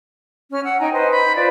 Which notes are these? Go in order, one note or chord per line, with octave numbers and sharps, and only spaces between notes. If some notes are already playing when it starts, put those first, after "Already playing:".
C#4 F6
F#5 E6
D#4 G5 G#5 A#5
B4 C5 D#5
B5 G6
F4 B4 C5 D5